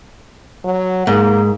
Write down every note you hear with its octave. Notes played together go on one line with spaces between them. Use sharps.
F#3
G#2 A#3